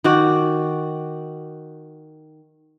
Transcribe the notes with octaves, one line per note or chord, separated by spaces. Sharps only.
D#3 F#4 D5